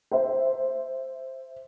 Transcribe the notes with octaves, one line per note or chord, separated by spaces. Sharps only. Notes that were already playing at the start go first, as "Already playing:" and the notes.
C5 E5